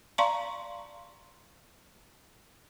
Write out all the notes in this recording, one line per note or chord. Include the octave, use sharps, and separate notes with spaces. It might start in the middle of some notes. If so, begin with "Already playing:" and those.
D5 F5 A5 A#5 C6 C#6